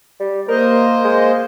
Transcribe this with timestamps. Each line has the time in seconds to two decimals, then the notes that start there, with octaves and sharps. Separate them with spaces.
0.20 G3
0.48 A#3 A#4 C5 D#5
1.04 G#3